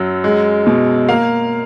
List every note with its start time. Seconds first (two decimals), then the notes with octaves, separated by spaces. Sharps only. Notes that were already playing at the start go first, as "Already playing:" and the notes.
Already playing: F#2 F#3
0.24 G#3
0.67 B2
1.09 A#3 F5